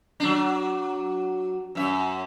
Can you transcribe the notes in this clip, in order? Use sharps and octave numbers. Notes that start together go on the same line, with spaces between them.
F#3 D4
F#2 E5